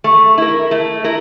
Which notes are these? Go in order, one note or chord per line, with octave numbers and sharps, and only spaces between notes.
A3
E4 A#4
A3
E4 A#4